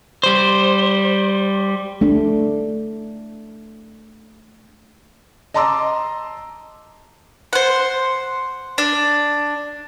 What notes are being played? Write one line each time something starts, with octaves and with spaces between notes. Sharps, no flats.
G3 C5
A3 D4
D#5 A5 A#5 C6 D6 E6
C5 F#5
D4